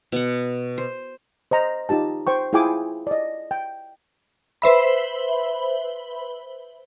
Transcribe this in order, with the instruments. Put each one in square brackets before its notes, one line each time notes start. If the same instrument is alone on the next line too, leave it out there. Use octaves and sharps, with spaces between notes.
[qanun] B2 F#5
C5
[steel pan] C5 D#5 A#5
D#4 F4 G4 A5
C5 G5 C#6
E4 F4 G#4 G5 G#5 D6
D5 D#5
G5
[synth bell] B4 C5 E5 B5